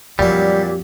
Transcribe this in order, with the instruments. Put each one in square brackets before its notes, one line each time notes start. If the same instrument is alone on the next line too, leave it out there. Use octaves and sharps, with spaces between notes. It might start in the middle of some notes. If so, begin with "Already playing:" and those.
[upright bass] F2 [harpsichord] A#2 F#3 [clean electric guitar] G3 [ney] G4